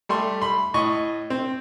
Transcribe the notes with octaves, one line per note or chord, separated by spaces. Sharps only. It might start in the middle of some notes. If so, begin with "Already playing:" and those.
G3 A3 C6
B5 C6
A2 D#5 C#6
C4